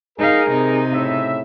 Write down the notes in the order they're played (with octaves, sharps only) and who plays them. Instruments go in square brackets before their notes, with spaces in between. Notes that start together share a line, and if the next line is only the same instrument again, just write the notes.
[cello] D#4 F5 [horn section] G#4 A#4
[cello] C3 D#4
[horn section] A2 C#3 E5